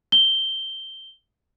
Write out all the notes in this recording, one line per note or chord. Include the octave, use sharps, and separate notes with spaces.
G7